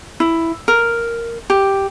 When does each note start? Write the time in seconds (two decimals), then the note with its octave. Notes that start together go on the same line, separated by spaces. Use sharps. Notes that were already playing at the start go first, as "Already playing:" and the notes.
0.20 E4
0.68 A#4
1.50 G4